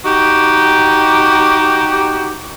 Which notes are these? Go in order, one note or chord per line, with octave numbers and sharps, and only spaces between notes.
D#4 F#4 G4